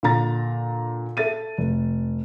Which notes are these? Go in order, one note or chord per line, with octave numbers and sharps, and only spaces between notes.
A#2 D3 A#5 A6
A4 E5 A6 D#7
F1